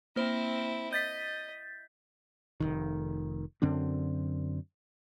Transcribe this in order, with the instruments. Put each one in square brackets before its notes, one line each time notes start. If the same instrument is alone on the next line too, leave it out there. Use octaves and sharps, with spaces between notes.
[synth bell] A#3 C5 [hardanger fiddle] C4 E4
[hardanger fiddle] D#5 [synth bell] G6 A6 B6
[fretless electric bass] F1 B1 D#3
F#2 D3 C4 D4